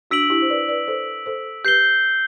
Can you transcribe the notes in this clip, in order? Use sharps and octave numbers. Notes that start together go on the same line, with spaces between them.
D4 F#4 E6 B6 D7 F#7
E4 G4
C5
B4 D5
B4 D5
A4 C5
A4 C5
G4 B4 G6 C7 G7